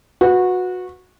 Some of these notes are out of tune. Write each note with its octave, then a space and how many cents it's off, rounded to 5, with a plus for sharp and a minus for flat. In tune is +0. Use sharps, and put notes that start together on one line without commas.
F#4 -20 B4 +0